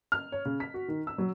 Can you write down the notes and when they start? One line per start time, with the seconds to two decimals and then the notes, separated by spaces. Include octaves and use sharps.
0.12 F6
0.32 C#5
0.45 C#3
0.60 B6
0.74 F#4
0.88 D#3
1.07 E6
1.18 F#3